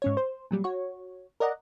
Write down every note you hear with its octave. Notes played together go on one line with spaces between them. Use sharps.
G#2 C#4 C#5
C5
A#2 F#3 G3
F#4 C#5
A#4 D5 D#5 F#5 A#5